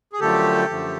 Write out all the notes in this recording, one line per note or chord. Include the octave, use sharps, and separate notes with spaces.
G#4
F#2 D3 F3 A3 G4 A4
F#2 D3 F3 A3